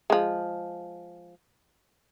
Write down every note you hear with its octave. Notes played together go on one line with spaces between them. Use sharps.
F3 G#3